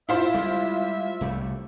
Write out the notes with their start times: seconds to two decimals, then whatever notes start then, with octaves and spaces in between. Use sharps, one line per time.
0.09 E4 F4 C5 E5
0.34 G3 G#3
1.21 C2 G3 A3